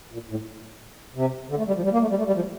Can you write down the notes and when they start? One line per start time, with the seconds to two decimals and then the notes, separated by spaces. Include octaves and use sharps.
0.13 A#2
0.30 A2
1.15 C3
1.50 D3
1.58 A3
1.67 G3
1.76 F3
1.84 G3
1.93 A#3
2.01 A3
2.10 G3
2.18 A3
2.27 G3
2.36 F3